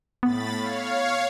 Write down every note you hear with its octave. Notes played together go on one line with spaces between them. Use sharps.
A2 B3 B5 A6
C#5 F5